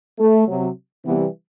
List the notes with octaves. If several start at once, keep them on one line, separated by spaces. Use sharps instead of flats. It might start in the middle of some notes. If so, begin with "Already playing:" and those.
A3
C3 F#3
C3 E3 G3 B3